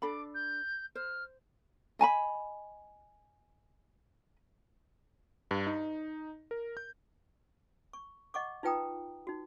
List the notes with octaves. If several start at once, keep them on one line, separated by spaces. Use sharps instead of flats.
D4 A4 B5 D6
G6
C5 F6
D#5 G#5 A5 B5
G2
D#4
A#4
G6
C#6
D#5 F#5 C#6 D6
D#4 F4 B4 G5 A#5 D#6
D#4 F#4